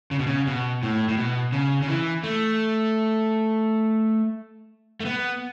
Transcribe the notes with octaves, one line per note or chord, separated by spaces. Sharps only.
C#3
B2
C#3
B2
A2
A2
B2
C#3
C#3
E3
A3
A3
B3